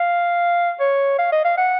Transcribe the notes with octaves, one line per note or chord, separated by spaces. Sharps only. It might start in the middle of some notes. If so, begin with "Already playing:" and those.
Already playing: F5
C#5
F5
D#5
F5
F#5